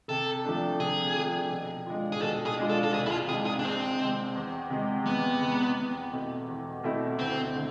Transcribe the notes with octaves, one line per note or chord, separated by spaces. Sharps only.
C3 A4
F3 A3 D4
C3 G#4
F3 A3 D4
B2
G#3 D4 F4
G#4
B2 A4
G#4
G#3 D4 F4
A4
A4
C2 G#4
E4
F4
C3 G#3 G#4
G#4
D4
C2 C4
C3 G#3
E2
C3 G#3
E2 B3
C3 G#3
E2
B2 A3 C4 E4
E2
B2 A3 C4 E4
D2 C4
D3 A3